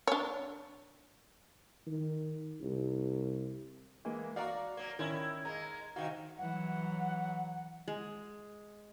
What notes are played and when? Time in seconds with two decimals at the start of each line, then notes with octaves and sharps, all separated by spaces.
0.07 D4 C#5
1.87 D#3
2.61 C2
4.05 E3 G#3 A#3
4.36 F#4 D5 F5 A#5
4.77 F#3 A#3
4.99 D#3 C#4 E4 A#4
5.45 G#3 A#3 A#5
5.96 C3 D#3 F#4 F5
6.38 E3 F#3 F#5
7.88 G#3